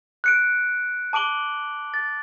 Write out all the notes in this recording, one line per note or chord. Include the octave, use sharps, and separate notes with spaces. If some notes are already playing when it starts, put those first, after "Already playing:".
F#6 C#7 D7
A5 D6 D7 F#7 G7
A6